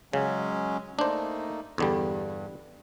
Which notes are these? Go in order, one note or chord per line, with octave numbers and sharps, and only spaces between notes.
C#3 F#3 G#3 C#4
A3 A#3 D4 D#4 C5
E2 G2 D3 G3